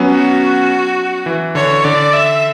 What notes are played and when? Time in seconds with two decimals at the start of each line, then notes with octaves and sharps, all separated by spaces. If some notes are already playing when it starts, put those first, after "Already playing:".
Already playing: F#3 B3 C#4
0.11 F#4
1.26 E3
1.55 D3 C#5
1.84 D3 D5
2.13 E5